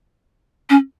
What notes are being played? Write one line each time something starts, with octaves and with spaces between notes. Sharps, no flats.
C#4